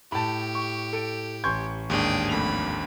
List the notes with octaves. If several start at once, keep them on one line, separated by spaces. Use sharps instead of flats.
A2 G4 A5 B5
C#6
A4 D7
A1 G#5 C6 C#6 G6 G#6
D#2 G#2 D4 G#4 G5
F2 A2 B5 F7